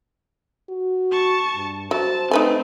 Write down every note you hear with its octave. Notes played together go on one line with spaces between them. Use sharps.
F#4
A5 C#6
G2
F#3 C5 A5
A3 C4 D#4 B4 G#5